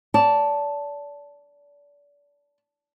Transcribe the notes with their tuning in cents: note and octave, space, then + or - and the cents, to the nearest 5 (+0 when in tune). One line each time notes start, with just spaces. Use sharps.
D5 -30 A5 +0